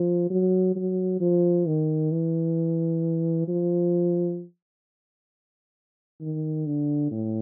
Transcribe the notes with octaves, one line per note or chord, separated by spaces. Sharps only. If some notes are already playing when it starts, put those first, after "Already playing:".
Already playing: F3
F#3
F#3
F3
D#3
E3
F3
D#3
D3
A2